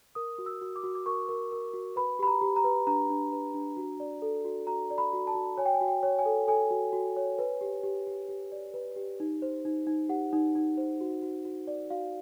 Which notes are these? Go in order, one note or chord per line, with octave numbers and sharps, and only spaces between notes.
A#4 D#6
F#4
E6
F#4
D6
F#4
D6
A#4 C#6
A#4
A#4
F#4
B4 B5
G4 B5
A#5
G4
A#5
B4
D4 A#5
D4
B4
D4
F#4
D5
A4
F#4
F#4 A#5
D5
B5
F#4
A5
F#4
C#5 G#5
G5
G#5
F#4
G5
C#5
G#5
A4
A4 G#5
F#4
F#4
C#5
B4
G4
G4
G4
G4
D5
B4
G4
D#4
C5
D#4
D#4
G4 F#5
D#4
D#4
C5
F#4
F#4
F#4
D5
F#4 F5